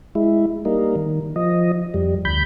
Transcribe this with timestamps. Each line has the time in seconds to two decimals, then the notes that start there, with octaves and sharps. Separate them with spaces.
0.15 G#3 E4
0.65 G3 A#3 D#4
0.96 D#3
1.36 F3 D#5
1.94 F2 G3
2.25 D2 B5 G6